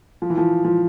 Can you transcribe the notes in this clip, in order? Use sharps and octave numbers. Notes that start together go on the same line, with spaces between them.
F3
E3
F3
F3